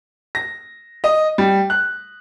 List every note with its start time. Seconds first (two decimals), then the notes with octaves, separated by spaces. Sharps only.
0.35 A#6
1.04 D#5
1.38 G3
1.70 F#6